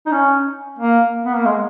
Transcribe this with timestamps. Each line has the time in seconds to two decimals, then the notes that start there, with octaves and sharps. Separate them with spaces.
0.06 D#4
0.11 C#4
0.79 A#3
1.26 B3
1.36 A#3
1.45 G#3